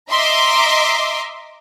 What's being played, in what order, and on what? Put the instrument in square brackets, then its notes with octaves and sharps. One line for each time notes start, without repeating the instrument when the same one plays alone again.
[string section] D#5 E5 A#5 C6 D6